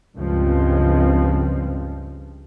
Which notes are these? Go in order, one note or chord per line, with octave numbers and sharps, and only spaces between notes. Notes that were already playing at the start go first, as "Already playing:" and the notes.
C#2 G2 C#3 F3 G#3 C4